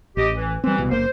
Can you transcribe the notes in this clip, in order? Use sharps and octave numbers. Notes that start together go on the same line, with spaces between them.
A1 G4 D#5
E3
E3 G3 C4
C2 B2
F#1 A#3 C5